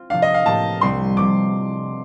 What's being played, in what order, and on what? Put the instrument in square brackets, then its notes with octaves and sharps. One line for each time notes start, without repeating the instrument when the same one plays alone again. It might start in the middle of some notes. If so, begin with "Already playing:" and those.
Already playing: [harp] C4 F4
[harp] C3 F3 A3 D4 [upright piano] F5
[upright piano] D#5
F5
[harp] A2 F3 A#3 D4 G4 [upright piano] A5
[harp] C2 C3 G3 C4 [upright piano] C6
[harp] C3 F3 [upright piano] D6